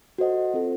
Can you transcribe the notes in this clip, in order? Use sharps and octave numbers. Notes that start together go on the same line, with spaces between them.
F#4 A4 C5 D#5 F#5
C4 F4 A4